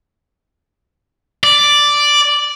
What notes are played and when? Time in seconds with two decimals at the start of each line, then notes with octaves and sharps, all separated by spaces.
1.44 D5